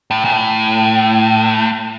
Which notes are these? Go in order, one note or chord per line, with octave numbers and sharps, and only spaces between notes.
A2
A#2
A2